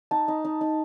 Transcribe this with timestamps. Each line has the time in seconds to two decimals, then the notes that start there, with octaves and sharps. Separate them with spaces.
0.11 D#4 A5
0.28 D#4
0.45 D#4
0.61 D#4